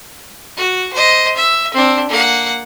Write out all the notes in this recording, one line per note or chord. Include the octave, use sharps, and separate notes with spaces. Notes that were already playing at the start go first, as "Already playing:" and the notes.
F#4
C5 D#5
E5
C4 D4
A#3 F#5